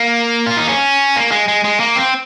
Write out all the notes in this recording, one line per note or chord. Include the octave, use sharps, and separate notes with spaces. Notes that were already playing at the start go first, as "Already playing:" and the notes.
Already playing: A#3
F4
D#4
C#4
A#3
G#3
G#3
G#3
A#3
C4